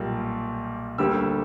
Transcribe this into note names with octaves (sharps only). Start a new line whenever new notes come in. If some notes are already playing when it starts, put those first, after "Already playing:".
Already playing: B1 A#2 G3 A#3
D2 D3 G3 A#3 E6